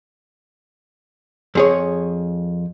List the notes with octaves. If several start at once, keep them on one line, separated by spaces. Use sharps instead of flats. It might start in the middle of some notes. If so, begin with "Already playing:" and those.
F2 G#4 C#5